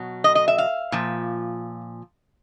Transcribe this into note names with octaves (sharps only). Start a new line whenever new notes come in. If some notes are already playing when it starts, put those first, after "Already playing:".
Already playing: B2 F#3
D#5
D#5
E5
F5
A#2 F3